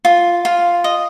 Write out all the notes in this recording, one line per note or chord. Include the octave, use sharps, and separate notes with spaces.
F4
F4
D#5